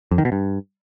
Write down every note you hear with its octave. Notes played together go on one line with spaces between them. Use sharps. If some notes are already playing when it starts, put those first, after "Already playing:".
F2
D#3
B2
G2